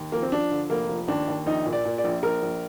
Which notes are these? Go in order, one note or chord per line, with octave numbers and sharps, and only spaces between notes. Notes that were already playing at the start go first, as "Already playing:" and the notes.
Already playing: D#2
F3 A#3
C4
F3 D4
D3
F1 A#3
F3
D#2 D4
D#2
A#1 D#4
A#2
D5
A#2
D5
A#1
A#1 A#4
A#1